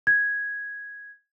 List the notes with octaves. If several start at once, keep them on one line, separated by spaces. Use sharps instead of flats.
G#6